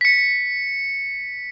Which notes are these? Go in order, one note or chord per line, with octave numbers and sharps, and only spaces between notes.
B6 C#7